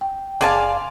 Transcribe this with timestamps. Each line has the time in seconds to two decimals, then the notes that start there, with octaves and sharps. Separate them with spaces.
0.01 G5
0.41 F#1 G#4 D5 E5 F5 G#5 A5 C6